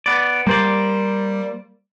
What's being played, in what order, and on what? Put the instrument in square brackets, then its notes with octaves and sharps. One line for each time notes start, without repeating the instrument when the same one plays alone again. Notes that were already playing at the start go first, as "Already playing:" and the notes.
[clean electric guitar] B3 D5
[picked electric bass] G3 [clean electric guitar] A#3 C5 D5